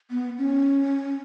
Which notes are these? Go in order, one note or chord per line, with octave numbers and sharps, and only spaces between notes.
B3
C#4